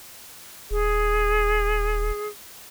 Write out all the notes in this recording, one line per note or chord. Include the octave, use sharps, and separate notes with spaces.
D#1 G#4